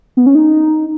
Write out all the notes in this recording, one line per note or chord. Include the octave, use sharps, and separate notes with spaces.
B3
C#4
D#4